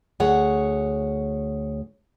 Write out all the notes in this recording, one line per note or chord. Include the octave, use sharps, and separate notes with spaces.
D2 G#4 C#5 F#5